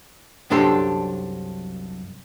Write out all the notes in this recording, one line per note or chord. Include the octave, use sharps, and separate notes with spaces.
C2 F#2 D4 G4 A4 C6